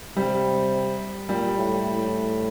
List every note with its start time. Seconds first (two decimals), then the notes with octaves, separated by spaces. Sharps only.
0.16 C3 G3
1.28 A#2 G3
1.57 A2
1.85 A2